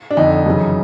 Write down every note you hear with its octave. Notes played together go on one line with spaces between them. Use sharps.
D4
F2 D3 D#4
F#2 C#3 E3